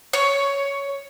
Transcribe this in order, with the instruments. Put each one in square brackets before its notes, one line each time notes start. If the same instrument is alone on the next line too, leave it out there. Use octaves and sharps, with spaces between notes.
[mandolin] C#5